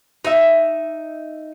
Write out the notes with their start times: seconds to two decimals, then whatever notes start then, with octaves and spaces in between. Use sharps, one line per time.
0.25 D#4 E5